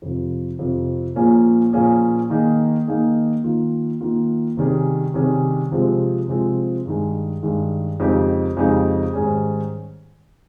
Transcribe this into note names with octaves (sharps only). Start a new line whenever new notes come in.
F2 C3 F3
F2 C3 F3
A#2 F3 A#3 C#4 G#4
A#2 F3 A#3 C#4 G#4
D#3 A#3 D#4 G#4
D#3 A#3 D#4 G#4
D#3 A#3 F4
D#3 A#3 F4
C3 D#3 G3 C#4 G#4
C3 D#3 G3 C#4 G#4
C3 F3 G#3 C4
C3 F3 G#3 C4
G2 D#3 G#3
G2 D#3 G#3
F2 C#3 G#3 D#4 G4
F2 C#3 G#3 D#4 G4
G#2 D#3 G3 C#4 G#4